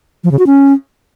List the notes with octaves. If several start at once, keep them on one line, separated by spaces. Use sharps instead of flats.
F3
C#3
F#4
C#4